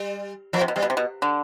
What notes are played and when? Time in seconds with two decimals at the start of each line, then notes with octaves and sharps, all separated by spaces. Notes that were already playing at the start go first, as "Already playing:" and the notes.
Already playing: G3
0.53 B2 F3
0.61 C3
0.68 B2
0.76 C3 G3
0.83 B2
0.90 C3
0.97 B2
1.22 D3